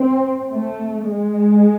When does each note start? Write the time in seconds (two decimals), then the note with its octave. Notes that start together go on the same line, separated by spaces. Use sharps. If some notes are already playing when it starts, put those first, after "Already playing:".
Already playing: C4
0.51 A3
1.09 G#3